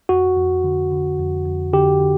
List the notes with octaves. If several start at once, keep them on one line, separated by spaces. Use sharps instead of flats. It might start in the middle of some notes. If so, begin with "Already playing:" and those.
F2 F#4
F2
D3
D3
F2
F2
D3 G4
D3